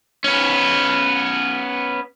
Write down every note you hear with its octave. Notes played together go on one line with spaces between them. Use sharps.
B3 C#4